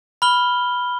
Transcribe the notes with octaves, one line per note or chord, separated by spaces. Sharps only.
B5 F6 G7